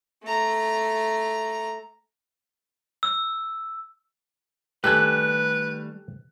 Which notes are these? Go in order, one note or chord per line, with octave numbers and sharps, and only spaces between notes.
A3 A#5
E6
D#3 G3 A3 G4 A4 B4 G#5 F#6